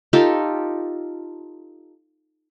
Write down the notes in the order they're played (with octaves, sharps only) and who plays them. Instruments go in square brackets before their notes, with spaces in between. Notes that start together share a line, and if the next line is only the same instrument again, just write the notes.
[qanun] D#4 F4 G4 A4